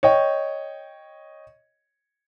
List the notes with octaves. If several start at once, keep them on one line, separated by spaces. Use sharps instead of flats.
C#5 D#5 G5